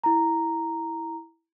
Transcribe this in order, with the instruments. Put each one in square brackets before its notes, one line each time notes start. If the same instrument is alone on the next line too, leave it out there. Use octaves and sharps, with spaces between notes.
[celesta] E4 A#5